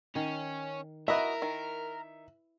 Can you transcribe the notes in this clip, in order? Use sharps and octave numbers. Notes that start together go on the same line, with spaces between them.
D#3 C#4
E4 F#4 A#4 B4 D#5 E5
D#3